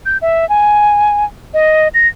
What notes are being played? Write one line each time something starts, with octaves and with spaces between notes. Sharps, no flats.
G6
E5
G#5
D#5
A#6